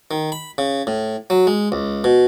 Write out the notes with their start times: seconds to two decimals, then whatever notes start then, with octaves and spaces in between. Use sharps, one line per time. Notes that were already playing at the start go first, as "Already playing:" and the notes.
0.11 D#3
0.32 B5
0.58 C#3
0.87 A2
1.30 F#3
1.47 G#3
1.72 C#2
2.04 B2